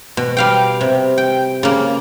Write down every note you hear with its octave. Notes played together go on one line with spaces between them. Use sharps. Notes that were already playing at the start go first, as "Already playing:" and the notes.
B2
G3 F5 G5
C3
G5
C#3 A#3